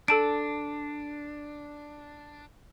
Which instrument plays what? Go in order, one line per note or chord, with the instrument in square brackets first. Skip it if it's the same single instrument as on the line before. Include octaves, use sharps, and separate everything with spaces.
[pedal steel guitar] D4 [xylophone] A4 A5 D7